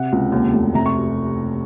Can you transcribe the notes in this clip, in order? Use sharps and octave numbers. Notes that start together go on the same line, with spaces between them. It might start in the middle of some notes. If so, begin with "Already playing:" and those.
Already playing: C3 F#5
C#2
D#2
F1
C3 A#5
C#6